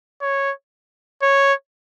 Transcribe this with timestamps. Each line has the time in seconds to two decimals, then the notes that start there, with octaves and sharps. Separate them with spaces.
0.22 C#5
1.23 C#5